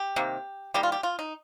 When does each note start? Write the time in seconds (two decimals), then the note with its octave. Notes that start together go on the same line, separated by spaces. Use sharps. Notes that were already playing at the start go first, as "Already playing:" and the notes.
Already playing: G4
0.16 C3 D#3 A#3
0.74 D#3 G3 A#3 G4
0.83 F4
0.92 G4
1.03 F4
1.19 D#4